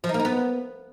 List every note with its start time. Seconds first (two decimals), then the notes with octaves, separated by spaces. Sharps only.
0.04 F3
0.09 D#4
0.14 A#3
0.20 D#4
0.25 B3